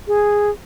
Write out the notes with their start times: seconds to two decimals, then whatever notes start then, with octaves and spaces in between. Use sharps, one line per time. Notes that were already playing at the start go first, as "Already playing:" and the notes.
0.07 G#4